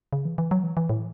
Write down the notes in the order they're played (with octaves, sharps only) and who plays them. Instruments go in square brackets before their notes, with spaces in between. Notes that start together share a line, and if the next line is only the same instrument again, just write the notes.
[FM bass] C#3
E3
E3
F#3
E3
E3
A2